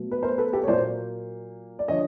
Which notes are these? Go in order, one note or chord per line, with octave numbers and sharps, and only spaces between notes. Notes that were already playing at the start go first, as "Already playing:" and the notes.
Already playing: B2 F#3 A3
B4
A#4 C5
A4 B4
G4 A4
C#5
A#2 F#3 A#3 C5 D5
D5
D3 F3 C#5 D#5